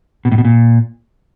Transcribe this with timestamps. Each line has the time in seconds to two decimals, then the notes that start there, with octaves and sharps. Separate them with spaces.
0.25 B2
0.32 A2
0.38 B2
0.45 A#2